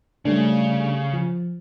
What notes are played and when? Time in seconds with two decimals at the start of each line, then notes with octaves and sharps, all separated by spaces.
0.25 C#3 G3 A3 D4
1.13 F3